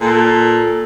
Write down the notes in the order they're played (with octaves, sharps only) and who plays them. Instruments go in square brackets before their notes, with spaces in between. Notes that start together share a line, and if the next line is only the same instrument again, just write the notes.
[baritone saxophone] A#2 [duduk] A4